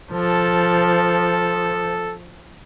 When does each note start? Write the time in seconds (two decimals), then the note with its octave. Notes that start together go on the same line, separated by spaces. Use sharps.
0.12 F3 A4